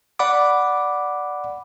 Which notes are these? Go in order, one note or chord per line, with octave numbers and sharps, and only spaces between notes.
D5 F#5 B5 D6